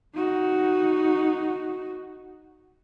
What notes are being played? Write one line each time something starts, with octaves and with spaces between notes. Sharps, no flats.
D#4 F#4